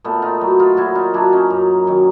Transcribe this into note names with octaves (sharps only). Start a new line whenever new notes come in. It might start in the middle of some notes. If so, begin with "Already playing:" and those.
A#2 A3 B3
D#4 F4
F#3
D#4 F4
A#2 E4 F#4
D#4 F4
F#3 D4 E4
C#4 D#4
F#2
D#3 F#3